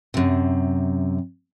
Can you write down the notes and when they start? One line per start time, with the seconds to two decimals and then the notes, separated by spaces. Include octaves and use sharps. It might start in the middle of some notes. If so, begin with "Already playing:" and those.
0.14 F#2 C3